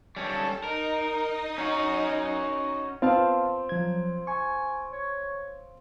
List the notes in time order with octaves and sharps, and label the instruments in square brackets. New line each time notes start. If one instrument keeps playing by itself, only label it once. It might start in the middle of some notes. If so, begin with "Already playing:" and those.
[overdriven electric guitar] G3 C#4 [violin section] A4
[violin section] D#4 D#5 [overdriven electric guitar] A#4
[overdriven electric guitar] C#4 F#4
[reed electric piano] B3 F5 A5 [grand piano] C4 F4
[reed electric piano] F3 G#6 [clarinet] F#3
[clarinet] G#5 [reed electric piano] C#6
[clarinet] C#5